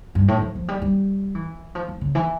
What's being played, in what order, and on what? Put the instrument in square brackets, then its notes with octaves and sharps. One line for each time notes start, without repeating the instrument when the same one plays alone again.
[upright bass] G2
A2
F3
F3
G3
G3
E3
F3
F3
C#3
E3